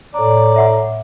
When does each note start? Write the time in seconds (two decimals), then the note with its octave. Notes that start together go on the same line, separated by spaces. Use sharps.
0.14 A2 A4 C#5 D5 A#5
0.56 E5 F#5 D6